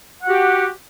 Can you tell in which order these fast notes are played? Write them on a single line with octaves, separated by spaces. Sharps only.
F#5 F#4 G4